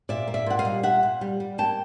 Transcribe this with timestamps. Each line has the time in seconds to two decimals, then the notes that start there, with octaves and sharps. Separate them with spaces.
0.09 A#2 D5 E5
0.28 A#3
0.34 D5 E5
0.46 A#2 F#5
0.59 D#5 F5
0.65 G3
0.83 A#2 E5 F#5
1.03 A#2
1.21 G3
1.40 G3
1.58 A#3 G5 A5